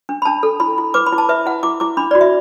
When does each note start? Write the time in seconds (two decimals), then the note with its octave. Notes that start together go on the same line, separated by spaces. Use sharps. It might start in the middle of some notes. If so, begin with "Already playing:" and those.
0.09 D4
0.22 B5
0.25 D4 A5
0.43 A4
0.60 E4 B5
0.78 E4
0.94 B4 D6
1.06 B5
1.12 E4
1.18 A5
1.29 B4 E5
1.46 E4 F#5
1.63 E4 D6
1.80 E4 D6
1.97 D4 B5
2.11 F#4 D5
2.21 E5